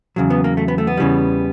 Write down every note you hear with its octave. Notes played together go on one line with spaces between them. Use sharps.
E2 C#3 F#3
B3
A#3
A3
B3
A3
B3
E2 C#3 E3 G3